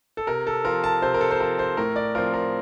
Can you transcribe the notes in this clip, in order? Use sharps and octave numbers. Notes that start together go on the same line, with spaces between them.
A4
C3 A#4
A4
F3 C4 A#4
A5
C3 C5
A#4
A4
C5
F3 C4 A#4
C5
A2 A#4
D5
F3 C4 A#4
A#4